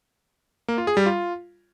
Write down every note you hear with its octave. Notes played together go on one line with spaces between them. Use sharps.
A#3
F4
G#4
G3
F4